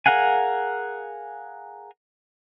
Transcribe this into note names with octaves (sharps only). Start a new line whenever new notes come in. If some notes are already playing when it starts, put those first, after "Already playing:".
G#4 A#4 F5 F#5 G#5